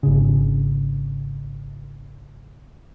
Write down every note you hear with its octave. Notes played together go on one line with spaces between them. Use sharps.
G#1 C#3